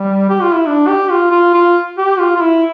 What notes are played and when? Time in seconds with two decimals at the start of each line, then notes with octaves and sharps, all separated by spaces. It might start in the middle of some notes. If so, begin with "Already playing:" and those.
Already playing: G3
0.30 G4
0.42 F4
0.54 E4
0.67 D4
0.88 G4
1.10 F4
1.31 F4
1.54 F4
1.98 G4
2.19 F4
2.36 F4
2.41 E4